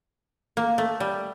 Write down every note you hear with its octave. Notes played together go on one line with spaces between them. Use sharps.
A#3
A3
G3